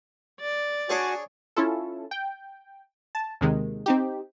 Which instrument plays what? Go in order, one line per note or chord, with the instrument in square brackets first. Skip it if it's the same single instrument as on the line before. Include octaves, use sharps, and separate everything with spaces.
[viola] D5
[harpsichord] D4 G#4 C#5 [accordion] F#4 G#5
[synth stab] C#4 E4 F4 A4
G5
A5
D#2 C3 D#3 G#3
C4 D#4 G4